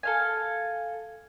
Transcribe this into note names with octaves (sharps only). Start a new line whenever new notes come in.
A4 F5 G#5